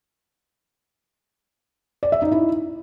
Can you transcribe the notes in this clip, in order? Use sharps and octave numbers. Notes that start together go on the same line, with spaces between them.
D5
E5
D#4
E4